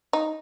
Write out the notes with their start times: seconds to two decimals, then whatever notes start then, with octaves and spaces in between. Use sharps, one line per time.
0.13 D#4